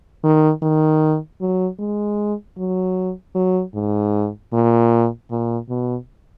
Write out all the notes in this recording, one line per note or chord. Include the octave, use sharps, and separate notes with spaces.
D#3
D#3
F#3
G#3
F#3
F#3
G#2
A#2
A#2
B2